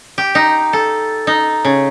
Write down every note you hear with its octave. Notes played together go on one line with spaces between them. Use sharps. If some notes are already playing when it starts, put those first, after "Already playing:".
G4
D#4
A4
D#4
C#3